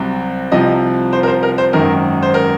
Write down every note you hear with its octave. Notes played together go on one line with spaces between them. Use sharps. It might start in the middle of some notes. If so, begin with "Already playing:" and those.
Already playing: C2 C3 F#3
C2 C3 F3 D#5
C5
A#4
C5
A#4
C5
G#1 F#2 D#3 A#4
C5
A#4